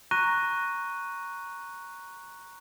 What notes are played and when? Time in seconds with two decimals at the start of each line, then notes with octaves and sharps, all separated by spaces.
0.11 A#5 C#6 F#6 A#6 D#7